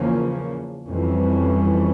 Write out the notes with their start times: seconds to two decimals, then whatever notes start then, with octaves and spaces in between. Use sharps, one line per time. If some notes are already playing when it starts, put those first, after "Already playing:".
Already playing: E2 C#3 F3 A#3 C#4
0.86 F2 E3 G3 C#4